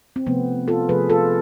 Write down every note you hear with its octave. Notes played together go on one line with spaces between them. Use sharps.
C4
C3 F3 A3 B3
F4 A4
C3 F3 A3 G#4 B4
F4 A4